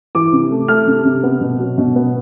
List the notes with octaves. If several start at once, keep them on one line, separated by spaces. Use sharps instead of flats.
E3 D6
C3
A3
A3 F6
C3
C3
B3
B2
F#3
B2
B3